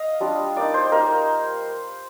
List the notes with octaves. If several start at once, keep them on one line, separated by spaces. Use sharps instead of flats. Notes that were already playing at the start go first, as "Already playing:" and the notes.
Already playing: D#5 F5
G3 D4 F4
A#3 D#4 D5
C5
A#3 D#4 A#4